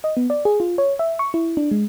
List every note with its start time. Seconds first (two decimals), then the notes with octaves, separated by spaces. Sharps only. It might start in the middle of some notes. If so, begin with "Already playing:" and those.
0.04 D#5
0.17 B3
0.30 D5
0.45 G#4
0.60 F4
0.78 C#5
0.99 E5
1.19 C#6
1.34 E4
1.57 D4
1.71 G#3